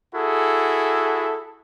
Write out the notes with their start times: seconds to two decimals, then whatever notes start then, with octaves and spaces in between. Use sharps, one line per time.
0.15 E4 F#4 G#4 A4